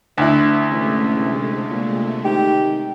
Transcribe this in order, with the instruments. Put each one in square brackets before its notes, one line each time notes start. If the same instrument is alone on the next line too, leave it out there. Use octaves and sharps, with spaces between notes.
[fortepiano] D2 E4 [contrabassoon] D3
[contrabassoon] A1 [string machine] C3 G#3 A3
[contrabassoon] A#2
[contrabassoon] D#3 [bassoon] G4